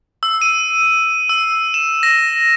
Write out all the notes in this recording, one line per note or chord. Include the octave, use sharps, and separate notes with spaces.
E6
D#7
E6
E7
A#6